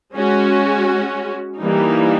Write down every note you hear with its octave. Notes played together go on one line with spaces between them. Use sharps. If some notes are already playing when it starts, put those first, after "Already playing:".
G#3 C#4 F#4
E3 G3 A#3 D#4